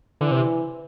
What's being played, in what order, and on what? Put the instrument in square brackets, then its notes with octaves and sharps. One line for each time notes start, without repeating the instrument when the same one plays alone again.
[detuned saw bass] D3 [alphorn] E3
[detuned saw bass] C3